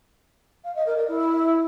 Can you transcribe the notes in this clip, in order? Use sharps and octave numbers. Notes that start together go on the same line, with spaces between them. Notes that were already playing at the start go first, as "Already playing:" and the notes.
F5
D#5
A#4
D5
E4